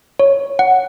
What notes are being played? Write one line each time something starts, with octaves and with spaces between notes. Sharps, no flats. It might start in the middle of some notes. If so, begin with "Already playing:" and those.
C#5
F#5